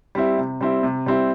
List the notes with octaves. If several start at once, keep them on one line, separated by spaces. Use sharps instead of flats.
G3 C4 E4
C3
G3 C4 E4
C3
G3 C4 E4